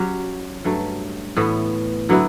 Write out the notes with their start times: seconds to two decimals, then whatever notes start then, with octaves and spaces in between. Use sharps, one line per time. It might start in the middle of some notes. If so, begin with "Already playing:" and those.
Already playing: F#3 C#4 G4
0.64 G2 F#3 A3
1.37 A2 E3 B3
2.09 D3 F#3 B3 E4